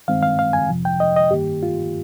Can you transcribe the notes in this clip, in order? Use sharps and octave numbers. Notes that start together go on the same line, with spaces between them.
G2 D#3 G#3 C4 F5
F5
F5
G#5
F2 C3 F3
G5
D#5
D#5
G2 D#3 A#3 G4
F4